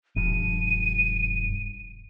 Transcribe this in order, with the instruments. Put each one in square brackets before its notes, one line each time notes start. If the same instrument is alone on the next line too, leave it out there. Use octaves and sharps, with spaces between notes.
[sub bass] E1 [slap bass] G2 F3 G3 [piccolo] D#7